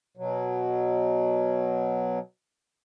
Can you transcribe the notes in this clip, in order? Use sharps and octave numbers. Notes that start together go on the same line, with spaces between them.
B2 F#3